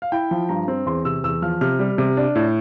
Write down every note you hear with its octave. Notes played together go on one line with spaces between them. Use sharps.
F5
E4 G5
F3
G2 A#5
C4
E2 C6
C3 E6
E2 E6
F3 F6
C3 F6
G3
C3
D4
A2